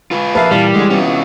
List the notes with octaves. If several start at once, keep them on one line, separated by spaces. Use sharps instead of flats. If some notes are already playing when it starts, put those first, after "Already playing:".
F4 B4
F3 A#3 B4 E5 F5 A5
A#2 E3 G3
D3 G#3
C3 B3 C#4 F4